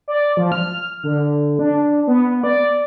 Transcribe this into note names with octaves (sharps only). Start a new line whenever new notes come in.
D5
F3
F6
D3
D4
B3
D5